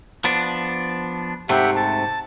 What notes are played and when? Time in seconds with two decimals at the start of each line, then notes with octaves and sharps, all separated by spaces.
0.24 F3 B3 D4
1.49 G#2 C3 A3 G4 E5 F#5
1.76 A5